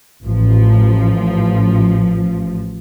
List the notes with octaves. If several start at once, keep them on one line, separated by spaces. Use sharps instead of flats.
A1 F3